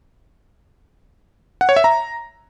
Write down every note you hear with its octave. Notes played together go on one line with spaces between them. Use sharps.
F#5
C#5
E5
A#5